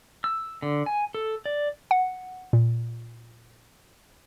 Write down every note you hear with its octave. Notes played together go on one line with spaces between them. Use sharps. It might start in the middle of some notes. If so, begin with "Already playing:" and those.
E6
D3
G#5
A4
D5
F#5
A#2